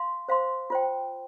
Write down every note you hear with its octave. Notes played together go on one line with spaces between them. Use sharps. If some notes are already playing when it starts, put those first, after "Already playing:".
Already playing: F5 C6
C5 F5 C6
F4 C5 G5